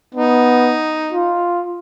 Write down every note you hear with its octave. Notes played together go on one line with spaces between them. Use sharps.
B3 D#4
F4